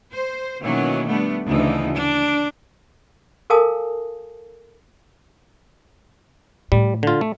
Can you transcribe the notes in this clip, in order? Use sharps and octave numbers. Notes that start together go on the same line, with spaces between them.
C5
B2 D#3 E3 F#3 A#3 C#4
G3 A3 B3 D4
D2 C#3 E3 F3 D#4
D4
A4 A#4 F5 G#5 A5 D#6
A2 G3
D3 F4
A3